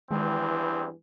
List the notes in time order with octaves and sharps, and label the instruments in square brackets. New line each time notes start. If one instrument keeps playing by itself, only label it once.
[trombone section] E2 G2 C4 [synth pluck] D#3 G#3 [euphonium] E3